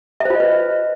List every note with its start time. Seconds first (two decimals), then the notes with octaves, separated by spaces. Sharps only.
0.20 E5
0.25 C5
0.30 F4
0.35 D#5
0.40 B4